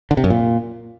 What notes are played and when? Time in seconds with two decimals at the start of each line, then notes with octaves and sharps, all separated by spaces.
0.11 D3
0.17 C3
0.24 F#2
0.30 A#2